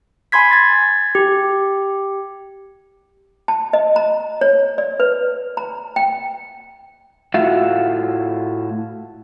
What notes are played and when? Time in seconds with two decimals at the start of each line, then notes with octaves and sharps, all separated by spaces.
0.32 G#5 B5 C6 G#6 B6
0.51 G#6 A6
1.15 G4
3.48 A5
3.73 D#5
3.96 A#5
4.41 C#5
4.78 D5
5.00 B4
5.57 A#5
5.96 G5
7.34 A2 F4 F#4 E5 F5